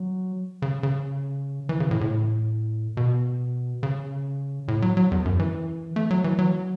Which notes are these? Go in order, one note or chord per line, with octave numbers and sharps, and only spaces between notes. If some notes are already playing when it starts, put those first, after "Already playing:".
Already playing: F#3
C#3
C#3
E3
C#3
A2
A2
B2
C#3
A2
F#3
F#3
E2
F#2
E3
A3
F#3
E3
F#3